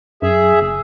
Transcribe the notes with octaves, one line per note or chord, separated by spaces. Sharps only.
F#2 G#4 E5
F#1